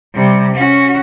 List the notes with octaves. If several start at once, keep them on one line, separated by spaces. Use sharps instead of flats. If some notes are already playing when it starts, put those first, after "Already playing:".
C3 G3
C#4 F#4